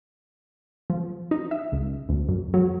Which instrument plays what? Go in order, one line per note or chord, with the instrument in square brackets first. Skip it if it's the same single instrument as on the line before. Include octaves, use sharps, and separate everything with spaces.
[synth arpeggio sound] F3
D#4
E5
C#2
D2
F#2
F#3